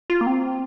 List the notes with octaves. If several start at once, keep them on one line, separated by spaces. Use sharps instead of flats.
F4
A#3
C4